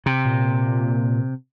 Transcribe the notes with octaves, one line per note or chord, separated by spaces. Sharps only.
C3
A#2